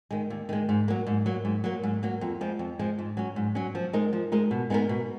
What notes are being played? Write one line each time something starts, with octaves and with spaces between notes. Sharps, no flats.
D#3 G#3
D#2
D#3 G#3
G#2
F#3 A#3
G#2
F#3 A#3
G#2
F#3 A#3
G#2
F#3 A#3
F2
F3 G#3
F2
F3 G#3
G#2
F#3 C#4
G#2
F#3 C#4
F3
G#3 D#4 A#4 D#5
F3
G#3 D#4 A#4 D#5
B2
G#3 B3 D#4 A#4
B2